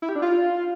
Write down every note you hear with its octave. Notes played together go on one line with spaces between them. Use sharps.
E4
G4
D4
F4